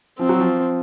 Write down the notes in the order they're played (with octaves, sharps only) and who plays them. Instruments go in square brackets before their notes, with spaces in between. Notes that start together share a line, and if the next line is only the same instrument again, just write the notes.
[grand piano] F3 [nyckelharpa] C4
[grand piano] F#3
F3